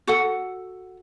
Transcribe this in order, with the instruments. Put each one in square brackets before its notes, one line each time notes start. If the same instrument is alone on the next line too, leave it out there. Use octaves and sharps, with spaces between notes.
[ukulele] F#4 A4 F#5